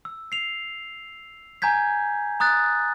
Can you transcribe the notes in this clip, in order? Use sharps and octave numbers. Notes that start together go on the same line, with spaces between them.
E6
C7 F7
G#5 A#5 G6 G#6 B6
A#5 D#6 F#6 A6